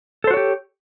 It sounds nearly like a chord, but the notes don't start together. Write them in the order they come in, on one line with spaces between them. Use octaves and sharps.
A4 C5 F#4 C#5 G4